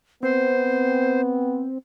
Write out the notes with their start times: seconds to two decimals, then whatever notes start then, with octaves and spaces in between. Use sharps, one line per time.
0.23 B3 C4 C5